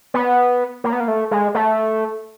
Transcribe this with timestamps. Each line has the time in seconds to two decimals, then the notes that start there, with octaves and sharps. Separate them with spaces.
0.14 B3
0.84 A#3
0.93 B3
1.00 A#3
1.08 A3
1.31 G#3
1.55 A3